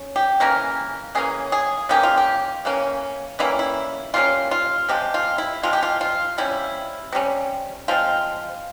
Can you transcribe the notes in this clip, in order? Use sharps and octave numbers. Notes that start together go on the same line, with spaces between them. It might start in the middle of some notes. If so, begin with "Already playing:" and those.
Already playing: C#4
G4
C#3 E3 A#3 C#4 A#4
C#3 E3 A#3 C#4 G#4
G#4
C#3 E3 A#3 C#4 G4
F4
G4
C#3 E3 A#3 C#4
E3 G3 A#3 C#4 E4
E4
E3 G3 A#3 C#4 F4
F4
C3 F3 G#3 G4
F4
E4
C3 F3 G#3 F4
G4
F4
F4
C3 G3 C#4 E4
C3 G3 C#4
F3 G#3 C4 F4